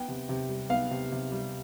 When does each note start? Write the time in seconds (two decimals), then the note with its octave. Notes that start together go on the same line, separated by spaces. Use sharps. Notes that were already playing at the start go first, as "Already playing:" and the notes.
Already playing: B3 G5
0.08 C3
0.29 C3
0.49 G3
0.69 B3 F5
0.91 C3
1.12 C3
1.32 G3